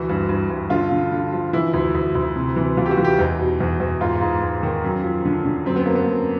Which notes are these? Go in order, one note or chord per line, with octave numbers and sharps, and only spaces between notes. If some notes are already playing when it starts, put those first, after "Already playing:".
Already playing: D2 E3 F#4
G2
G2
G2
D3 F4
D3
D3
F3
E3 E4
D2
D2
D2
C3
E3
E3 F4
G4
F#4
E3
G4
E2 D#4
B2
E2
E2
G#2 F4
G#2
G#2
D#3
F#2
F3
D3
D3
F#2 C4
B3
F#2 A#3
B3
F#2